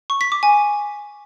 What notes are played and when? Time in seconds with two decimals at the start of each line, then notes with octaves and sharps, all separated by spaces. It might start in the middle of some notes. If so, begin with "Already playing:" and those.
0.10 C#6
0.21 B6
0.32 D6
0.43 G#5